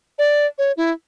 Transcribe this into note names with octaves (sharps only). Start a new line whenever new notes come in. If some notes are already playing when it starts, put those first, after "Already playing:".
D5
C#5
E4